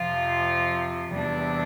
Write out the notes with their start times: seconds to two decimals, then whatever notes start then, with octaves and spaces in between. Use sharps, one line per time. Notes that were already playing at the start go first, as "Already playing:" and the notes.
Already playing: F2 C3 F3 F4
1.12 E2 C3 G3 D4